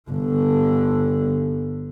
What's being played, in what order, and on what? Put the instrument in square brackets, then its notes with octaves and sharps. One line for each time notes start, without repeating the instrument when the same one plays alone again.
[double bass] G1 D3